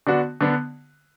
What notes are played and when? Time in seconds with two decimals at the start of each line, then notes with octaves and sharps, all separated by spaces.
0.07 D3 B3 D4 F#4
0.41 D3 B3 D4